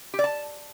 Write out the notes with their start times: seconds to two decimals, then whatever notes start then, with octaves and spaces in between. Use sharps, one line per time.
0.14 G4
0.19 D5
0.24 A5